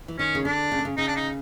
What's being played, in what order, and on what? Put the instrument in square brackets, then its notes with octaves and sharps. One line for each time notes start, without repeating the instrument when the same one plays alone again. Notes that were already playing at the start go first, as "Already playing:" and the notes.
[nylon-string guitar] E3
[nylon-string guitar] D#3 [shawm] C#4
[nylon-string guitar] C#3
[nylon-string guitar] D3 [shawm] D4
[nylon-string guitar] C#3
D3
C#3
[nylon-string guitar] C#3 [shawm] D#4
[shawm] D4
D#4